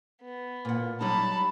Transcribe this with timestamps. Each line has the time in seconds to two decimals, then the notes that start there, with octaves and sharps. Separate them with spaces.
0.22 B3
0.65 A#2 F#5
1.01 F#3 G3 D#4 A5 B5